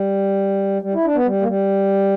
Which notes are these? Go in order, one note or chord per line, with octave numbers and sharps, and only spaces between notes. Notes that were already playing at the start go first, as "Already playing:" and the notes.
Already playing: G3
G3
E4
D4
B3
G3
A#3
G3